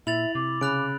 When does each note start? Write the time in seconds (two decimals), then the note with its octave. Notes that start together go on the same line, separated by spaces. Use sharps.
0.07 A#2 E4 E5 A6 F7 F#7
0.35 C3 D6
0.61 C#3 B5 F#6 D7